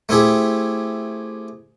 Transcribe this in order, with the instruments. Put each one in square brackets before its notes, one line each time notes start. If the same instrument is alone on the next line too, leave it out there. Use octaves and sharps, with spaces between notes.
[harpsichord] A3 C4 E4 G4 G#4